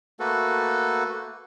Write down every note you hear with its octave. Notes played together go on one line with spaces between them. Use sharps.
A3 A#3 F#4 A4 B4